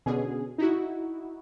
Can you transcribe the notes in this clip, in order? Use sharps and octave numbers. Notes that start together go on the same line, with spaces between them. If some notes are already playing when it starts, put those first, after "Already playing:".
B2 D3 C#4 G#4
D#4 E4 F#4